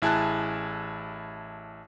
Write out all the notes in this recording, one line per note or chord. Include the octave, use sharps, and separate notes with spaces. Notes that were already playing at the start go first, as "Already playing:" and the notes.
A1 E4 G#4 A5 F#6